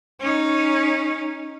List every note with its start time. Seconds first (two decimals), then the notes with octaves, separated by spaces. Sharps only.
0.20 C#4 D#4